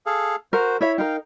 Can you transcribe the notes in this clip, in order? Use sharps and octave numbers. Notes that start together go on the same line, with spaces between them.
G#4 A4 F5
F#4 A#4 C5
E4 C#5 E5 B5
D#4 A#4 F5 G5